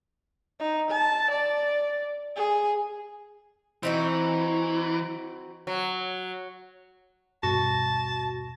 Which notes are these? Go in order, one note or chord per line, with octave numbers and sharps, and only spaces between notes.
D#4
A5
D5
G#4
E3 C4 D#4 F#4
F#3
D#1 G2 B2 F#4 A5